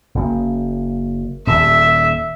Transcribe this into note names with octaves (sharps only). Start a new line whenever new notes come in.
F#1 F#2 A#3
D#1 E5